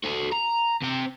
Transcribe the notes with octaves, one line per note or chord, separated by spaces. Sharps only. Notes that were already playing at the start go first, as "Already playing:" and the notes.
F#4 A4
A#5
C3 G5